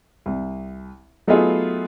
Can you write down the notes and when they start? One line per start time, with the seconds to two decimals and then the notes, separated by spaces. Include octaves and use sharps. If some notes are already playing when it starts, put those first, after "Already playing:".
0.26 C2
1.27 F#3 A3 B3 D#4 F4 G#4